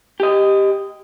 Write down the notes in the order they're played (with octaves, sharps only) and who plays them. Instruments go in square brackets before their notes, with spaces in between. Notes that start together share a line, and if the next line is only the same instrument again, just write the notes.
[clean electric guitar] G4 D#5